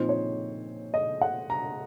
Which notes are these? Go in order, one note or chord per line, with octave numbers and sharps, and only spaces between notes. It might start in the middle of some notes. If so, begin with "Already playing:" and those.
Already playing: A#2 F3 C4 D#4 C5
C#5
D#5
F#5
A#5